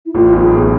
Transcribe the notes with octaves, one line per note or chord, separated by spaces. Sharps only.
E4
A1 A2 F4
B1 B2
G#4
A1 A2